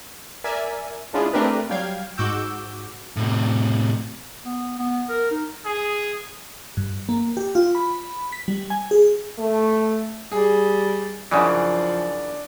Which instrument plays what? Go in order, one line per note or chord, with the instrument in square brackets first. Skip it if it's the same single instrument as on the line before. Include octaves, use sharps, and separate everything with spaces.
[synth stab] A#4 D5 E5 G#5
G#3 C#4 D4 E4 F4 G#4
A3 C4 D4 G4 A#4 B4
F#3 G3 F5 G5 G#6
G#2 F#4 D6 E6 G6
[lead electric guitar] A2 C3
[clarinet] B3
B3
A#4
D#4
[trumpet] G#4
[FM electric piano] G2
A#3
G4
F4
B5
B6
G3
G#5
G#4
[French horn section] A3
[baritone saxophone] G3 [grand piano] G#4
[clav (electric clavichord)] F#2 C#3 E3 [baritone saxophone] F3 [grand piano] D4